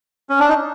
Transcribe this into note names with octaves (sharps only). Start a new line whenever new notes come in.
C#4
D4
D#4